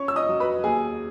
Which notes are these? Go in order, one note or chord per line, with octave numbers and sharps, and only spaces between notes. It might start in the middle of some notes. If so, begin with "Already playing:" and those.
Already playing: C#4 C#5 C#6
E6
D#5 D#6
F#3
B4 B5
D#2 G#4 G#5